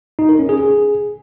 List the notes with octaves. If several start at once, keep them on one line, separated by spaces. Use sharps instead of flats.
D#4
A#4
C#4
G#4
G#4